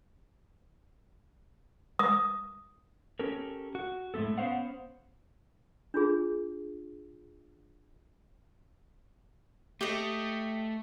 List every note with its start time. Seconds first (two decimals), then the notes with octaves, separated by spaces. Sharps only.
1.99 D#6
3.19 C#4 G4 A4 A#4
3.75 F#4
4.14 A2 G#3 A3 B3 A4
4.38 B3 C#4 C5 F5 F#5
5.94 D4 F4 G#4
9.81 A3 G4 D#5